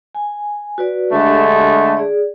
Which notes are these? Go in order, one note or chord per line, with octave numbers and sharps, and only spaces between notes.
G#5
F#4 B4 D5
D3 G#3 A3 D4 G4
G#4 D5